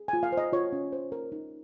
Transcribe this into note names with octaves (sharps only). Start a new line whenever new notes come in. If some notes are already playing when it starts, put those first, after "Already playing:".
Already playing: G#4
F4 G#5
F5
C5
D#5
F4 C#5
C#4
C5
A#4
D#4